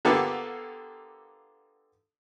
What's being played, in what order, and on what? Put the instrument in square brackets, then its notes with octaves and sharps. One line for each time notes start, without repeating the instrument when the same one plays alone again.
[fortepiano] D3 A#3 B3 F4 G4 A4